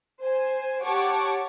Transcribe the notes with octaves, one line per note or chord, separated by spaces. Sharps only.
C5 G#5
G4 C#5 F#5 A5 C#6 D6